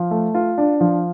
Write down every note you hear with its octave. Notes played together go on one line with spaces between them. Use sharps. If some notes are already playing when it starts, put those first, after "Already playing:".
Already playing: F3
A3
F4
D4
F3